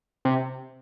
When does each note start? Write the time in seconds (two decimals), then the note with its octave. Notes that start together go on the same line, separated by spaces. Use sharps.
0.25 C3